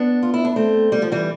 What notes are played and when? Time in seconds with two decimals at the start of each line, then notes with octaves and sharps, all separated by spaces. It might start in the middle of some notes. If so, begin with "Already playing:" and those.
Already playing: B3 D4
0.23 F4
0.34 E4
0.45 D4
0.56 A3 C4
0.92 G3
1.02 F3
1.12 E3 G3